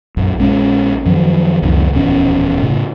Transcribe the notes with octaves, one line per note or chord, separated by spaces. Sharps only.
A#1 F#2
A#1 G#3 C#4
F#2 D#3 F3 F#3
C#2 F#2 C3 D#3
D1 A#1 E2 C#4
A2 C#3